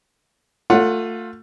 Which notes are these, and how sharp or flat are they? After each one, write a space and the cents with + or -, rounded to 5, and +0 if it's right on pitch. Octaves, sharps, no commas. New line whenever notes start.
A3 +30 F4 +25 F#5 +0